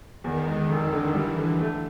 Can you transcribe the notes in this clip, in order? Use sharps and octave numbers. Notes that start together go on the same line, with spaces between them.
E2 D#3
G#3
F1 D#3
D3
E3 G3
D3
A3